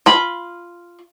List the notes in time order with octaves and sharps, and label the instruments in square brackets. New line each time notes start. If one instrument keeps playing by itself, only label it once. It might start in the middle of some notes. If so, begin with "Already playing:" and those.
[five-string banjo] F4 B5